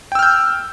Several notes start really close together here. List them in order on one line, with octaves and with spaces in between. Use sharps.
G5 E6 F6 G6